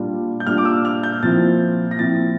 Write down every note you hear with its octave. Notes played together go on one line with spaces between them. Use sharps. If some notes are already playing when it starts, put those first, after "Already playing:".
Already playing: A#2 G3 D4 F4
G6
A#2 G3 D4 F4 F6
D6
E6
F6
G6
A#2 F3 C4 E4 A6
A#6
A#2 F3 C4 E4 A6